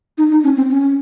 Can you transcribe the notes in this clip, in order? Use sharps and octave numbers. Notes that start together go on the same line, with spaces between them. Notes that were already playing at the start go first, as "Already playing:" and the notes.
D#4
D#4
C#4
C4
C#4